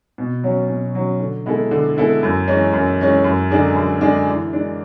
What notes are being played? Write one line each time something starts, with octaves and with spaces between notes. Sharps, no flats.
B2
F#3 C#4
B2
F#3 C#4
D3
G#3 B3 E4 A4
D3
G#3 B3 E4 A4
F#2
E3 G#3 C#4
F#2
E3 G#3 C#4
F#2
D3 G#3 D4 G#4
F#2
D3 G#3 D4 G#4
E3
G#3 D4